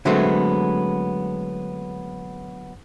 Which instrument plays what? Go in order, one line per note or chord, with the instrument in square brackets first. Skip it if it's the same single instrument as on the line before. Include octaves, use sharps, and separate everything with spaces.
[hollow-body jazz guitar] D3 F#3 G#3 A3 B3 C4